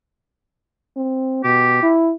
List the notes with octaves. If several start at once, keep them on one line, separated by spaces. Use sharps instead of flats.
C4
B2 G4
E4